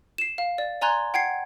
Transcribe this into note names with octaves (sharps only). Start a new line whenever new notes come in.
C7 E7
F5
D5
D5 G#5 A#5 C6 F#6 G#6
F#5 G5 G#6 C7